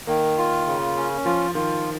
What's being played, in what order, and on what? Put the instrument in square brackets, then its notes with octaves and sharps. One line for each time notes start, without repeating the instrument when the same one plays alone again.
[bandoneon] D#3 [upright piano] A#3
[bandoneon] F4
C#3
C#4
[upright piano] F3 [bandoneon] F4
[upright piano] D#3 [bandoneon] F4